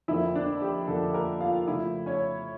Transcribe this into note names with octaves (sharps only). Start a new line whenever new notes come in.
F2 D3 F3 A#3 E4 E5
D4 D5
G4
F2 D3 F3 A#3 A4
A#3 A#4
F4 F5
C#3 F3 A3 E4 E5
C#4 C#5